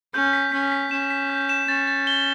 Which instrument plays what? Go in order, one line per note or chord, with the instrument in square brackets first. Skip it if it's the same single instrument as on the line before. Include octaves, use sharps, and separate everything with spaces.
[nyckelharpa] C#4 [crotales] G6
[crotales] B6
[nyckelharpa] C#4 [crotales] B6
[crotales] B6
[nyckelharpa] C#4 [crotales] E7
[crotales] B6
G6
E7
[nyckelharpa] C#4 [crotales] A6
[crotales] A6
G7